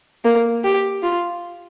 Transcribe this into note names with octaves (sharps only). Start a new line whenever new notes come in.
A#3
G4
F4